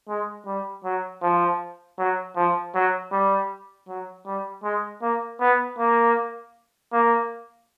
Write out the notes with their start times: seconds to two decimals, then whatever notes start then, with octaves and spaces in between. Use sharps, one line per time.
0.08 G#3
0.46 G3
0.84 F#3
1.22 F3
1.98 F#3
2.36 F3
2.74 F#3
3.12 G3
3.88 F#3
4.26 G3
4.63 G#3
5.02 A#3
5.40 B3
5.79 A#3
6.92 A#3